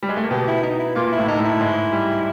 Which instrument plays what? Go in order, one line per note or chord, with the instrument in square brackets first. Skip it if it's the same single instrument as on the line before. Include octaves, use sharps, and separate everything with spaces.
[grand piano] G3
G#3
A3
A#3
[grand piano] B2 B3 [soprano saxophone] G4
[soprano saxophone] E4
D#4
E4
[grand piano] A#2 A#3 [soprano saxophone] F4
[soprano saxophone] E4
[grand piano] A2 A3
[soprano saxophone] D#4
[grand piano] A2 A3
[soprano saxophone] E4
[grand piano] G#2 G#3
G3